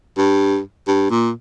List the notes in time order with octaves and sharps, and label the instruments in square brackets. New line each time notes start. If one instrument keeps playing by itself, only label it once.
[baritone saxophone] G2
G2
A#2